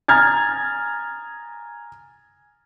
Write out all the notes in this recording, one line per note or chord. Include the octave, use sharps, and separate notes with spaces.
G#5 A#5 D#6 F6 G#6 A6